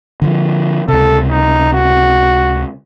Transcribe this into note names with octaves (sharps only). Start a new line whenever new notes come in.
D3 E3 F3
C#2 C3 A4
D#4
F#4